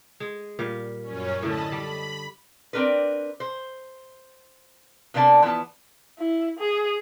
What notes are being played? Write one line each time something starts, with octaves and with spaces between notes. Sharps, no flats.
G#3
A#2 G3 F5
F#2 C#4
A2 D3 D#5 A5 B5
G3 B5
C4 D4 A#4 B4
C5
C3 A#3 B3 D4 F#4 A5
E3 F3 B3 A5
E4
G#4